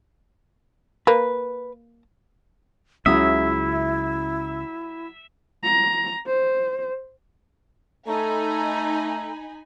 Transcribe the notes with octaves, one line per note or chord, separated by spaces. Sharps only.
A#3 B4
C#2 C#3 F#3 E4 E5 D#6
A#5
C5
A3 D#4 A4 G#5 A#5 B5